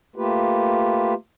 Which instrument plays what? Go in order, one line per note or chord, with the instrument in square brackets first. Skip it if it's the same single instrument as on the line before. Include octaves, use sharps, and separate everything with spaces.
[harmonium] A3 A#3 F4 G4 B4